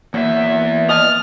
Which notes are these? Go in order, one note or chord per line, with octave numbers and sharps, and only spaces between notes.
E2 F#3 A#3 E5
D#5 A5 F6